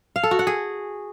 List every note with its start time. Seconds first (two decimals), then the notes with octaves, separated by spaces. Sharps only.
0.16 F5
0.23 A4
0.31 F#4
0.39 F#5
0.47 G#4